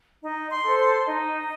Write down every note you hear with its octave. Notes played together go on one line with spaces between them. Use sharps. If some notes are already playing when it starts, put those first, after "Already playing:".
D#4 D#5
C6
A4 C5
C6
D#4 D#5